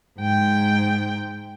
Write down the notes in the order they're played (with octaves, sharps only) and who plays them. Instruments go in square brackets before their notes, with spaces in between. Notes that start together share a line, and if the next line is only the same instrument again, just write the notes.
[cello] G#2 G5